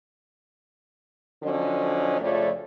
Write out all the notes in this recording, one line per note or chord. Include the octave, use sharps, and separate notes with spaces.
D3 F3 F#3 C#4 C#5 D#5
F2 C#3 F3 A3 C#5 D5